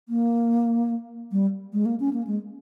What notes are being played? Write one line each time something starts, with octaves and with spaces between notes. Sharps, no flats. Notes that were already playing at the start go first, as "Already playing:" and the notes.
A#3
G3
G#3
A#3
C#4
A#3
G#3